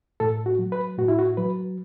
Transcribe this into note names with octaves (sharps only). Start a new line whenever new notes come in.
A2 A4
F#4
F#3
B4
A2 F#4
E4
F#4
F#3 B4